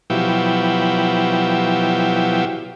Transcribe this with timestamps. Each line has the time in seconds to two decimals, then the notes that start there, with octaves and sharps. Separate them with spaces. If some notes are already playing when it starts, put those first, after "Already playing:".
0.10 B2 F3 F#3 E4 G4